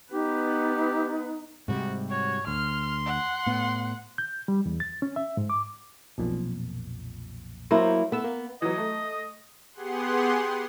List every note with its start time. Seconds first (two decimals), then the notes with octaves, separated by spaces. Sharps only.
0.13 B3 D#4 G4 B4
1.68 G#2 C3 G3 F#4
2.10 F#4 C#5
2.47 D2 C6 F6
3.06 F#5
3.46 A2 B3
4.18 G6
4.48 G3
4.66 E2
4.80 A6
5.02 C#4
5.16 E5
5.37 G#2
5.50 D6
6.18 B1 F2 A#2
7.71 F#3 A#3 E4 C5
8.12 A3 B3 E6
8.24 A#3
8.62 E3 F#3 D#5
8.78 A3
9.73 B3 G4 G#4 F#5 C6